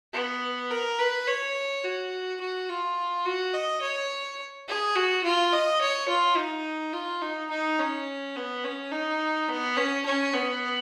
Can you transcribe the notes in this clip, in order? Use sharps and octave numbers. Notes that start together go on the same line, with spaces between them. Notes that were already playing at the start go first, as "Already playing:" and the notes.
B3
A#4
B4
C#5
F#4
F#4
F4
F#4
D#5
C#5
G#4
F#4
F4
D#5
C#5
F4
D#4
F4
D#4
D#4
C#4
B3
C#4
D#4
B3
C#4
C#4
B3